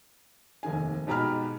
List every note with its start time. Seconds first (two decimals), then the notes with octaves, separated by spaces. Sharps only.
0.63 F1 D#2 D#3 G#5
1.07 G#2 B2 G4 A#5 B5 F6